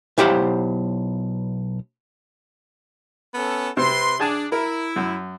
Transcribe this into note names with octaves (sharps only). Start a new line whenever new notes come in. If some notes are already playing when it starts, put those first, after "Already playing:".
B1 E4 G4 C5 F5 F#5
B3 C#4 A4
C3 C4 B4 C6
D4 G#4 G#5 A5
E4 A#4
F#2